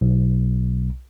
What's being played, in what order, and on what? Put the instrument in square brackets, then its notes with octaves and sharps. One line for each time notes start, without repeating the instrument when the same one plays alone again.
[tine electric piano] B1